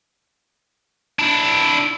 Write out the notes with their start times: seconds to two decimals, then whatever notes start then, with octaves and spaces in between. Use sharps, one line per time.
1.19 D4 E4